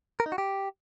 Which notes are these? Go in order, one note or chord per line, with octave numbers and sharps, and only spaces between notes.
A#4
D#4
F#4
G4